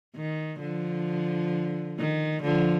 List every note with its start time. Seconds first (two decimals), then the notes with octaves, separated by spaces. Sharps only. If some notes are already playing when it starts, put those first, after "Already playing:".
0.16 D#3
0.61 D3 F3
1.98 D#3
2.44 D3 F3